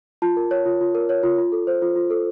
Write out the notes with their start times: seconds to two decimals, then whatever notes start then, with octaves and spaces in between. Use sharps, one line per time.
0.22 F4 A5
0.37 A#4
0.51 C#5
0.65 F4
0.81 F4
0.95 A#4
1.09 C#5
1.23 F4
1.38 F4
1.52 A4
1.67 C5
1.82 F4
1.96 F4
2.10 A4